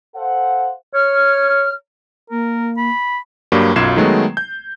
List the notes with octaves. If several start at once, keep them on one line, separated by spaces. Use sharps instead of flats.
A4 C5 F5 F#5
C#5 F6
A#3 A#4
B5
G2 F#3 G3 A#3
B1 F#2 F4 G#6 C7 E7
D#3 F#3 G#3 A3 B3
G6